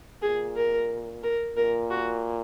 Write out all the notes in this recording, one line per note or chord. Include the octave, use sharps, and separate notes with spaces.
A#2 G#4
A#4
A#4
A#2 A#4
F#4